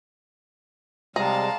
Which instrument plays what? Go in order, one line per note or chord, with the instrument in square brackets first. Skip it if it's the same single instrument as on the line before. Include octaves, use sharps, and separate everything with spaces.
[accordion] C3 G3 G#3 [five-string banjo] G#4 A#5 [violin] F5 A5